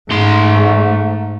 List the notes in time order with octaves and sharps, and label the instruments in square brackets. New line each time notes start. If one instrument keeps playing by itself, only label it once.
[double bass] G#2 [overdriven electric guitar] A3 C6